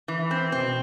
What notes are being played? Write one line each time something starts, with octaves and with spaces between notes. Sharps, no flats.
E3
C4
B2 C4